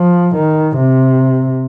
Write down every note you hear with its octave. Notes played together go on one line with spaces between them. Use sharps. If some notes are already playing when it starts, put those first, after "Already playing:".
Already playing: F3
D#3
C3